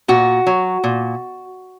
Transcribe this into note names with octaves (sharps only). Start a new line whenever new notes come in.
A#2 F#4
F#3
A#2